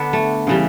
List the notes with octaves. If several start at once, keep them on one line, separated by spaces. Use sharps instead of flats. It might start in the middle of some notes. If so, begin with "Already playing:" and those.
Already playing: D3 B3 D4
A3
C#3 E3 G3